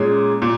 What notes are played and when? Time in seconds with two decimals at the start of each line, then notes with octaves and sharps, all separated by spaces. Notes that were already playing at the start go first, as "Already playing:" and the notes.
Already playing: A#2 G#3 C#4
0.42 A#2